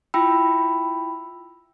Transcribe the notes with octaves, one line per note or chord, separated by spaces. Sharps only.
E4 F4 G5 B5 E6